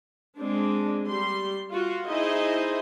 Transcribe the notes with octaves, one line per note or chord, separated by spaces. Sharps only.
G#3 C4 D4
G3 C6
F4 F#4
D#4 E4 G#4 C5 D#5